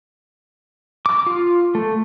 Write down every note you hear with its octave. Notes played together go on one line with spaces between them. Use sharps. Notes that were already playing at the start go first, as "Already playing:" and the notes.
D6
F4
A3